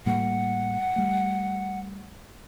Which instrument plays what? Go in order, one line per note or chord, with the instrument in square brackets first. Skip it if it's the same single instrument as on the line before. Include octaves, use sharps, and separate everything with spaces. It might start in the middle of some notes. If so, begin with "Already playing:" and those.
[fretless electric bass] A2 G3 A#3 [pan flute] F#5
[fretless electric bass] G3 A3